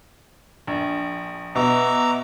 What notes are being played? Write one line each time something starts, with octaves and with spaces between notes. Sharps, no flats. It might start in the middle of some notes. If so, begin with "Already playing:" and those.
A#1
B2 E5 A#5 D6